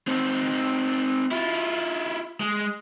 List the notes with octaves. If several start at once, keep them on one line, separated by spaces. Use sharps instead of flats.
C4 D#4
E4 F4
G#3